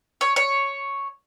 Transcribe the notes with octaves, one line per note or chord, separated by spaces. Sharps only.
C#5
C#5